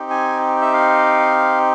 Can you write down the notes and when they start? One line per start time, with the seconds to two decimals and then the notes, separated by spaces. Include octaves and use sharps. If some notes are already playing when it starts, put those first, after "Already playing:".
Already playing: C4 D#4 G4
0.10 G#5
0.61 E5
0.73 F5